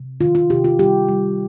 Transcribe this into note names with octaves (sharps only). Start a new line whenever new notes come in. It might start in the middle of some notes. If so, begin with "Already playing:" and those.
Already playing: C3
D#3 F4
F4
C3 G4
F4
G3 G4
G3